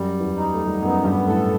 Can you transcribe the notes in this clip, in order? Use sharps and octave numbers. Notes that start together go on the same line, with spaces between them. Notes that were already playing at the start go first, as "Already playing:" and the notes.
Already playing: F#2 F#3 G3
E2 E3
D#4
A3
G3
F#2 F#3 B3
G2 G3
A2 A3 A4